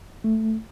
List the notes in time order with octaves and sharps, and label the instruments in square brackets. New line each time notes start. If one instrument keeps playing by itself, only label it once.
[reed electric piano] A3